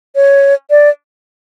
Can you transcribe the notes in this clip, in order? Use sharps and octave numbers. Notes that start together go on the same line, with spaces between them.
C#5
D5